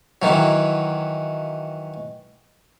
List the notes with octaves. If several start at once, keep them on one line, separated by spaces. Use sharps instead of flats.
D#3 E3 F#3